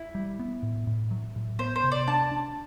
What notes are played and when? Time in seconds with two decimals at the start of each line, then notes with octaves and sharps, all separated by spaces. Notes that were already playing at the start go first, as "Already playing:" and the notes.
Already playing: E4
0.15 G3
0.39 B3
0.63 A2
0.87 A2
1.11 F#3
1.36 A2
1.59 B3 C5
1.76 C5
1.84 C3
1.92 D5
2.08 D4 A5
2.32 D4